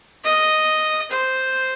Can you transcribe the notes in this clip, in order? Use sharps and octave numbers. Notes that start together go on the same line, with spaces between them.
D#5
C5